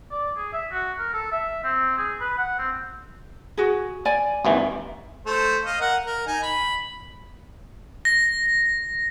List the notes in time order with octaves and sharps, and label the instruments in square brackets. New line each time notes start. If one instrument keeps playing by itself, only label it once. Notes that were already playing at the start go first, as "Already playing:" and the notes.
[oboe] D5
G#4
E5
F#4
A#4
A4
E5
C4
G#4
B4
F#5
C4
[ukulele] F#4 G#4
D5 G#5
[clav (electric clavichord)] G#1 D#2 E3
[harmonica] A3 C5
D#5 F5
A#4 F#5
A#4
D#4 G#5
B5
[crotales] A#6